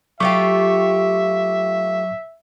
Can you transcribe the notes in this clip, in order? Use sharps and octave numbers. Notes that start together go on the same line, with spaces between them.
F#3 A3 F4 G4 E5 C#6 D6